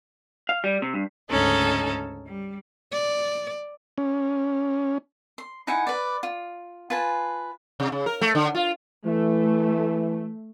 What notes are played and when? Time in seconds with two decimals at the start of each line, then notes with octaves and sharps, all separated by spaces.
0.49 F5
0.64 G3
0.82 C3
0.94 G2
1.30 D2 G#2 C#3 C#4 D#4 A4
2.24 G3
2.92 D5
3.98 C#4
5.38 C6
5.67 D#4 E4 F#5 G#5
5.87 B4 D5
6.23 F4
6.90 F4 B4 G#5 A5
7.80 C3
7.92 C#3
8.06 A#4
8.21 A3
8.35 D3
8.55 F4
9.07 E3 A3